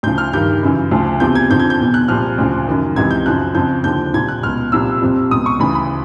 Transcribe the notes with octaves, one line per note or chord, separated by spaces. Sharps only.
D2 C#3 F3 G6
F6
G2 D#3 G6
F#2 C#3 E3
D2 C#3 F3
E2 C3 F3 G6
G#6
F2 D3 F3 G6
G#6
G6
E2 B2
F#6
C2 A#2 F3 F6
D2 C#3 F3
F#2 D#3
C#2 C3 E3 G#6
G6
F#2 C#3 F3 F#6
F2 C#3 F3 G6
D#2 D3 F3 G6
C2 A#2 F3 G#6
F#6
C#2 B2 F6
C2 A#2 F3 E6
F2 C3 F3
C#2 B2 D#6
C#6
D2 C#3 E3 B5
B5